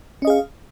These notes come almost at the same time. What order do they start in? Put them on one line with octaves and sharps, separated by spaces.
C#4 D#5 G#4 F5